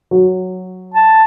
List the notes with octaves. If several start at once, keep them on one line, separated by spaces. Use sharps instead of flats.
F#3
A5